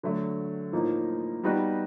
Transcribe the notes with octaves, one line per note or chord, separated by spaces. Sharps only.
D3 F#3 A3
A2 F3 A#3 D#4
G3 B3 D#4 F#4 B4